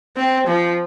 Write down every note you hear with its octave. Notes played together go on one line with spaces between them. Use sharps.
C4
F3